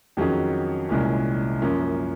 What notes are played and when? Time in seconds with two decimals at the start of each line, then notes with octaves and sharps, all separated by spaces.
0.17 F2 D#3 F#3 C#4 G#4
0.89 C2 A#2 G#3 C#4
1.62 F#2 F3 A#3 C#4